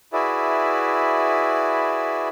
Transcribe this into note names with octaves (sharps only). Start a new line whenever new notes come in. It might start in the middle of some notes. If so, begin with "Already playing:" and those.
E4 F#4 G#4 B4 D5 E5